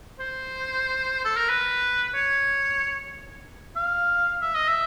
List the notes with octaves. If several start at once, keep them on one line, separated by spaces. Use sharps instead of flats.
C5
A4
A#4
B4
C#5
F5
E5
D#5
E5